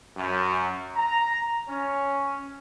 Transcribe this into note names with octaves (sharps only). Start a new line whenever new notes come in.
F#2
A#5
C#4